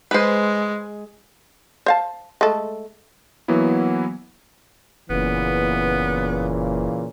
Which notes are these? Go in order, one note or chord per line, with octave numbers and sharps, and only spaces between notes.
G#3 B4 C5
C5 F5 A5
G#3 A3 A4
E3 F#3 A#3 B3 E4
F#1 A#2 C#3 E3 B3